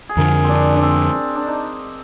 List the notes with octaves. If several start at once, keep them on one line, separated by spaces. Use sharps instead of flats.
G#4
F2 D3 F3 A#4
C4
D4
D4
C4
D4
D#4